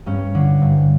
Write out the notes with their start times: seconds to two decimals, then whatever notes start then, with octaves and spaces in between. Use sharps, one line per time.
0.06 G2 C#4
0.35 D3
0.62 G2